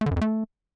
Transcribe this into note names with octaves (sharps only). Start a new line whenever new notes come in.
A3
D3
F#2
F2
A3